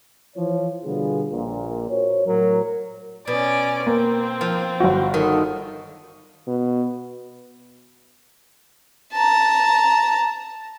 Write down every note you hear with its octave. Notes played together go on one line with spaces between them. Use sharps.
E3 F3 C#5
B2 D3 G3 B3 F4 G#4
A#1 A#2
F#4 A#4 C5 C#5
A2 F#3 A#4
B2 C#4 D5
A#3 C4
F3
G1 F#4
D#3 A4
B2
A5 A#5